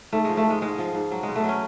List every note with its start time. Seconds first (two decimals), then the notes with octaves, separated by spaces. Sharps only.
0.12 G#2 A3
0.25 F3 G#3
0.37 A3
0.46 G#2 G#3
0.62 G#2 G#3
0.78 F3
0.95 G#2
1.11 F#3
1.23 B2 G#3
1.36 A3
1.44 F#3 C#4